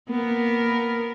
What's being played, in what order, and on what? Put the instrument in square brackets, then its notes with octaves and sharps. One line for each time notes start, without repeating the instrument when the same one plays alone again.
[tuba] A#3 [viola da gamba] B3 A#4